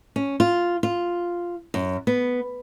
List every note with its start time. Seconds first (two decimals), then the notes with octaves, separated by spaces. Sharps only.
0.16 C#4
0.40 F4
0.83 F4
1.74 F#2
2.07 B3